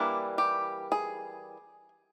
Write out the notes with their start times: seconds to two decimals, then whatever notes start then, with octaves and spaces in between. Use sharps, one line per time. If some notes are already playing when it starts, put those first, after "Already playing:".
Already playing: E3 G3 A#3 D4 E4
0.38 G4
0.92 G#4